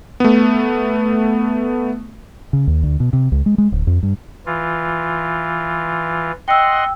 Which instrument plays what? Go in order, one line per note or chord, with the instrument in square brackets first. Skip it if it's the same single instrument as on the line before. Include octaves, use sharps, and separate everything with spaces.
[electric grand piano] A3 B3
[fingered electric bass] C#3
D#2
D2
B2
C3
C#2
G#3
G#3
D1
F2
G2
[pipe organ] E3 F4
[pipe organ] D#5 F#5 C6 [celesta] G5 E6